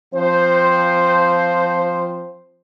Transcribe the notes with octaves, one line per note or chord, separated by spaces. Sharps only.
F3 C4 C5